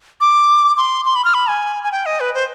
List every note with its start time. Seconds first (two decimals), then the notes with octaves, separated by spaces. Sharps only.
0.21 D6
0.77 C6
1.05 C6
1.16 B5
1.25 F6
1.34 B5
1.49 G#5
1.83 G#5
1.92 G5
2.06 D#5
2.20 B4
2.34 C5